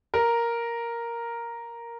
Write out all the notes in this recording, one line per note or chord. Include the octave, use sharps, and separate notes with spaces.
A#4